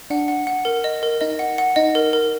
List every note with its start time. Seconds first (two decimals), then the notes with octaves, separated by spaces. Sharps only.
0.10 D4 F#5
0.28 F#5
0.47 F#5
0.65 A#4
0.84 D#5
1.03 A#4
1.21 D#4 D#5
1.39 F#5
1.58 F#5
1.76 D#4 D#5
1.95 A#4
2.13 A#4